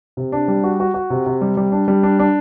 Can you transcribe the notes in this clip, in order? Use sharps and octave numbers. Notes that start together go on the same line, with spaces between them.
C3
D4
G3
F#4
F#4
F#4
C3
C3
G3
G3
D4
G3
D4
D4